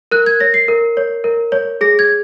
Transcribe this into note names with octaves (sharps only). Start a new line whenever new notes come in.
A#4 F#6
G#6
C#5 A#6
C7
A#4
C#5
A#4
C#5
G#4 A#6
G#6